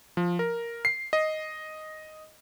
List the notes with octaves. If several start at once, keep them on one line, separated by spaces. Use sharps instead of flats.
F3
A#4
C7
D#5